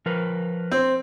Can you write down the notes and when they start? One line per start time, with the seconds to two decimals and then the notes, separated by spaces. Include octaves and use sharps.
0.06 F3 A#4 B4
0.72 C4